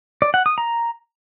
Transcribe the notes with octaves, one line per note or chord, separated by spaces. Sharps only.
D5
F#5
D#6
A#5